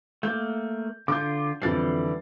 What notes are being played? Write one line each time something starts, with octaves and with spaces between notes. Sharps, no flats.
A3 A#3 G6
D3 F4 D6 G6
F2 D3 E3 G3 A6 C7